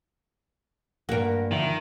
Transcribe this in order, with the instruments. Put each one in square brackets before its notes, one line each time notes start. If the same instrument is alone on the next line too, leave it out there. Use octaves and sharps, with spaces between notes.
[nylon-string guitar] G2 A#3 [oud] F#4 A#4
[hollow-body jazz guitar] D3 F3 E5 [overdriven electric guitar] D#3